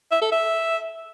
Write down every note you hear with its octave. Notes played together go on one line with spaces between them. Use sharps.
E5
A4
E5